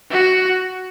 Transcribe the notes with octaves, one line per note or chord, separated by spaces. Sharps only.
F#4